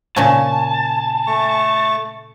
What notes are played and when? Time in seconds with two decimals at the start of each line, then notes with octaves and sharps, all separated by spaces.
0.16 A#2 C#3 C#4 G#5 A5
1.27 A3 C#6